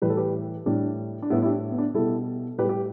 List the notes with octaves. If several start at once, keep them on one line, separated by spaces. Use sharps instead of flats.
A2 E3 G3 B4
A4
G4 B4
A2 G3 D4
D4
A2 G3 B3 E4
E4
D4 G4
B3
D4
B2 G3 E4 A4
A2 G3 G4 B4
G4